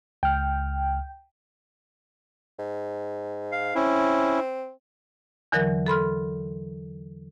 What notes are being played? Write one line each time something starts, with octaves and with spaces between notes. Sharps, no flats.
C#2 G5 F6
G#2
F5
C4 C#4 E4
E2 D3 E3 F#3 A#4 F#6
A4 B5 C6 F6